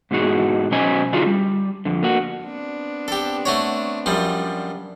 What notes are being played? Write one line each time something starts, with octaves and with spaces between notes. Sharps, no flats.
G#2 B2 E3 D#4 F#4 G#4
B2 F#3 C#4 C5 D#5 G#5
D3 D4 D#4 F4 F#4 G#4
G3
F2 D3
A#3 F#4
B3 C4 D4
G4 A4
A3 F#4 C#5
F#2 F3 G3